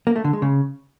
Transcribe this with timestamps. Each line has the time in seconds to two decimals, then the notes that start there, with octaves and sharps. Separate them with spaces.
0.07 A#3
0.16 A3
0.24 D3
0.33 G#3
0.42 C#3